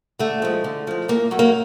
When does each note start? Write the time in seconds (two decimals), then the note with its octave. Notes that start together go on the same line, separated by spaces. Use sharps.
0.19 D3 A3
0.42 F3 G#3
0.64 D3
0.87 F3 G#3
1.08 A#2 A#3
1.31 F#3 A3
1.39 A#3